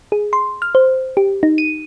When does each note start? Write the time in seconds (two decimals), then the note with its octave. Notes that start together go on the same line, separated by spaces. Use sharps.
0.12 G#4
0.33 C6
0.62 F6
0.75 C5
1.17 G4
1.43 D#4
1.58 D#7